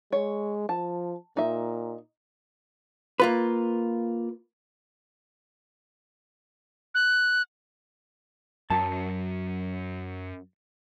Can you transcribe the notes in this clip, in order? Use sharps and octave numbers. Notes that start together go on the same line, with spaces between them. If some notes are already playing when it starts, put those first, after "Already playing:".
G#3 C#5
F3 A5
A#2 D#4 E5
A#3 F4 B4
F#6
F#2 F#3 A5